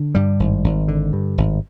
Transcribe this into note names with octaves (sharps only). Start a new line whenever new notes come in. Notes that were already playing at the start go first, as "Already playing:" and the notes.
Already playing: D3
G2 G3
G#1
G#1
D3
G2
G#1